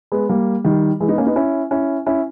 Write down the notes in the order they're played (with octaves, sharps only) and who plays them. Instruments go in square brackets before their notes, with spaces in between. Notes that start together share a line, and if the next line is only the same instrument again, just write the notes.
[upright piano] G#3 B3
G3 A#3
D#3 G3
E3 G#3
B3 D#4
A#3 C#4
B3 D#4
C#4 E4
C#4 E4
C#4 E4